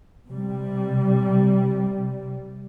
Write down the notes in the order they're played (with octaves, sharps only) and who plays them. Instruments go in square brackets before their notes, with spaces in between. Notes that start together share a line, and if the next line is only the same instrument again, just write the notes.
[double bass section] C3 G3